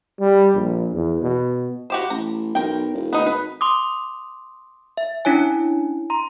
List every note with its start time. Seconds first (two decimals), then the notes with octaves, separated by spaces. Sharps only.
0.20 G3
0.54 A#1
0.93 E2
1.22 B2
1.90 F#4 G4 C5
2.10 A1 A#5
2.55 B1 A#4 G5
2.94 E1
3.13 D2 B3 D#4
3.27 G#1 B4
3.61 C6 D6 D#6
4.97 E5
5.25 C#4 D4 E4 C#5 G#5
6.10 A#5 C6